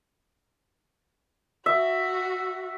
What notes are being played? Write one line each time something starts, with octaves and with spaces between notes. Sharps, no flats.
F#4 E5